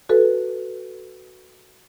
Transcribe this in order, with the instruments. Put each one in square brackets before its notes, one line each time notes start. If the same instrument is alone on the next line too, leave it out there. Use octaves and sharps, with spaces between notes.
[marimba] F#4 A4 B4